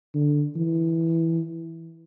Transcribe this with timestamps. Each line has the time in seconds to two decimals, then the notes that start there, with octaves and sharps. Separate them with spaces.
0.14 D3
0.56 E3